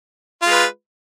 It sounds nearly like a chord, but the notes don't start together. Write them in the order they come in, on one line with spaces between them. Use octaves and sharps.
F4 G#3 B4